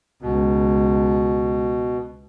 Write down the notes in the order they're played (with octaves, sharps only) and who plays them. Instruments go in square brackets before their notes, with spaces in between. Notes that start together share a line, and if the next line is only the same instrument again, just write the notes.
[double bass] C#2 [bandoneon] B2